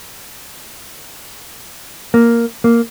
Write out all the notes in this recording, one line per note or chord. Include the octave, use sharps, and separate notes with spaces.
A#3
A#3